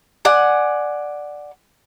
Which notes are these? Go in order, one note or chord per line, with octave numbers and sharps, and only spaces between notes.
D5 F#5 G#5